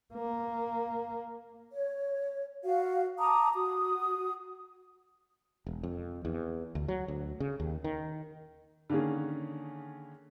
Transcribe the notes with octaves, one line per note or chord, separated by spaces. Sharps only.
A#3
C#5
F#4 F5
A5 A#5 D6 D#6
F#4 D#6
E1
F2
E2
D2
F#3
D2
C#3
D#2
D#3
D3 D#3 A#3 C#4 G#4